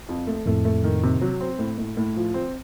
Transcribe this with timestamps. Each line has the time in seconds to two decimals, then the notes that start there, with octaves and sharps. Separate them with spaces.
0.09 F2
0.27 A3
0.46 F2 A2 A3
0.65 A3
0.84 D#3
1.03 C3
1.22 F#3
1.41 C4
1.59 A2
1.78 A2
1.97 A2
2.17 F3
2.34 C4